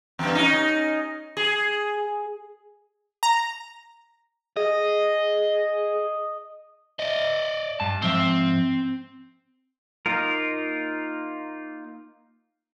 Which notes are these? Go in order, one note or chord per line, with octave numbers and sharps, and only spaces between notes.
E2 G2
C#4 D#4
G#4
A#5
G#4 D#5
D5 D#5
G2 A5
G#2 F3 C4 E5
A#3 D#4 F4 A#4